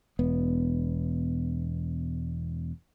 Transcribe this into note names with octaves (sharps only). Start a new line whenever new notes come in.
E1 B3